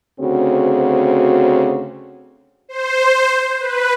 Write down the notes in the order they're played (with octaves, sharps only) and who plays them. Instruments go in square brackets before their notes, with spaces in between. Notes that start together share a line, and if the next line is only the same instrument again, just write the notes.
[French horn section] D2 C#3 C4 F#4
[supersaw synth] C5
B4